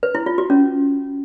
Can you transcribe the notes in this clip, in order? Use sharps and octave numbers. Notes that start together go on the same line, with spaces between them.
B4
E4
F4
F#4
C#4